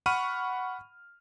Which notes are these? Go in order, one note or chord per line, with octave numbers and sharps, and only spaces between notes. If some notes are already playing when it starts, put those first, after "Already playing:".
F#5 B5 C#6 F6 D#7